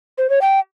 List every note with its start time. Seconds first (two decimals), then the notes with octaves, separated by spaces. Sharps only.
0.18 C5
0.30 C#5
0.41 G5